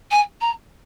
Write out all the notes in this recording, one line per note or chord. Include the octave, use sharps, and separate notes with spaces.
G#5
A#5